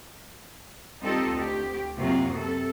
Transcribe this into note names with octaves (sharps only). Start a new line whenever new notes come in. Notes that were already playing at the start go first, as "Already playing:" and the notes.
G3 C4 D#4 F4 G4 A4
D2 G4
F#2 C3 F#3 A#3 F4
C3 A4